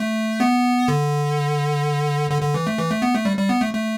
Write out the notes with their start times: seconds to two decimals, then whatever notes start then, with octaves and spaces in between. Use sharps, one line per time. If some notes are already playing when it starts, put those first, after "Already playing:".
Already playing: A3
0.40 B3
0.88 D3
2.31 D3
2.42 D3
2.54 E3
2.67 A3
2.78 E3
2.90 A3
3.02 B3
3.14 A3
3.25 G3
3.37 G3
3.49 B3
3.61 A3
3.73 A3